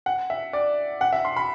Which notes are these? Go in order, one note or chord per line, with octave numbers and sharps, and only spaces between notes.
F#5
E5
D5
F#5
E5
C6
B5